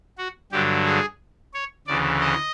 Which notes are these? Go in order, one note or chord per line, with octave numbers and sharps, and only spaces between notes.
F#4
G2 D3 F#3 G4
G#4
C#5
D2 C#3 E3 D5
D#5